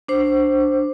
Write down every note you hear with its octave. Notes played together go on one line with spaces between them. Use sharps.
D4 C5